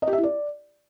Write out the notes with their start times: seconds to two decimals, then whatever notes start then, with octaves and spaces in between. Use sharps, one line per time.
0.02 D#5
0.07 G4
0.13 E5
0.18 E4
0.23 D5